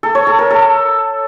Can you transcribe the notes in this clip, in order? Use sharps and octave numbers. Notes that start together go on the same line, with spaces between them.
A4
C#5
A4
A#4
A4